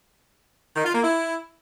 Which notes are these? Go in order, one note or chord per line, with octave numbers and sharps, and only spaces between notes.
D#3
F4
A#3
E4